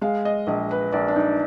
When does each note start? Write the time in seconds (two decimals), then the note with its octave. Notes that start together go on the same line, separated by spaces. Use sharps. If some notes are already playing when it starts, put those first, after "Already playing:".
0.01 G#3 F5
0.25 D#5
0.47 A#1 D#5
0.71 B4
0.92 A#1 D5
1.08 D4
1.16 D#4